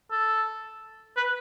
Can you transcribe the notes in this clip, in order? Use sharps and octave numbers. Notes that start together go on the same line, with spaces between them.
A4
B4